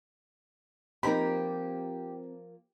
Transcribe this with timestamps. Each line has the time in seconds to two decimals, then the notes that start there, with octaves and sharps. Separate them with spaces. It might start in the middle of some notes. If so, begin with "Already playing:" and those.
1.03 F3 A#3 C4 D#4 G4 A#4 B5